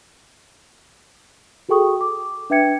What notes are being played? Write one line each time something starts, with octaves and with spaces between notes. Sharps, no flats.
F#4 G#4 A4 G5 C#6 D#6
D6
D4 B4 E5 G5 G#6 C#7